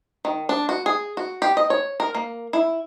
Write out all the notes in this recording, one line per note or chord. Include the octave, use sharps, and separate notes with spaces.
D#3
D4
F#4
G#4
F#4
G4
D#5
C#5
A#4
A#3
E4